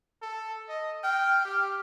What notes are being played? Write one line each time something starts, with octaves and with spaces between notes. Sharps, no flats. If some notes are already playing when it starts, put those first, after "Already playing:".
A4
D#5
G5 F6
G4